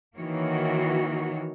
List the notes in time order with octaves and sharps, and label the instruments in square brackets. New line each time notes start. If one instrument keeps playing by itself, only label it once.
[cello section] D#3 E3 A#3 F#4 C#5